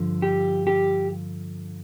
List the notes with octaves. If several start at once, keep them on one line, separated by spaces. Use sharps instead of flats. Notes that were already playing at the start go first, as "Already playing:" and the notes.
Already playing: G2 D3 F3
G4
G4